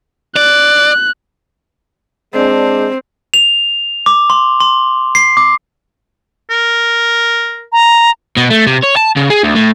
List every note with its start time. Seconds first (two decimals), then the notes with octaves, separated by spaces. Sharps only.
0.36 D5 F#6
2.34 G#3 C4 D4
3.34 F7
4.06 D6
4.30 C6
4.60 C6
5.15 C7
5.37 D6
6.50 A#4
7.72 A#5
8.38 B2
8.51 A3
8.67 C3
8.83 C#5
8.96 A5
9.16 C#3
9.30 G#4
9.43 D2
9.55 A2